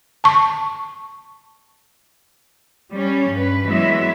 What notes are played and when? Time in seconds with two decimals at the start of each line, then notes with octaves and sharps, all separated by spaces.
0.24 A5 C#6
2.91 G3 C#4
3.30 G2 B4
3.66 E3 F#3 G#3 B3 E5